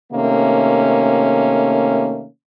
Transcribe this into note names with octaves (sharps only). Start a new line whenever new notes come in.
C3 D#3 A3 A#3 C#4